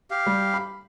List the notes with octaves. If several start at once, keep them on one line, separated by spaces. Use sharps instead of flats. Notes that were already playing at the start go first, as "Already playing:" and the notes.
G4 F5
G3
B5